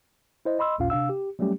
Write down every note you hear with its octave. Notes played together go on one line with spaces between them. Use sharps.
E4 C5 D#5
D#5 B5 C6 E6
A1 D#2 A#2 C#4 F4 F5
C3 D4 F5 E6
G4
F#3 G3 A3 C#4 G4